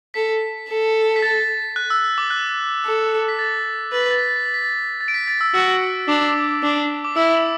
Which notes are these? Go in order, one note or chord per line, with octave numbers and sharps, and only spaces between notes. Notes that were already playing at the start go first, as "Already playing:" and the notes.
A4 B6
A4
B6
A6
F#6
E6
E6
D6
F#6
A4
B6
A6
B4 A6
B6
A6
B6
A6
B6
A6
B6
A6
A6
D7
B6
A6
E6
F#4 E6
D4 D6
D4
D6
E4 E6